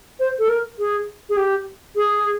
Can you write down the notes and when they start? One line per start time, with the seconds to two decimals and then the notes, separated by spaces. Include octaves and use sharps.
0.20 C5
0.39 A4
0.49 A#4
0.79 G#4
1.29 G#4
1.37 G4
1.96 G#4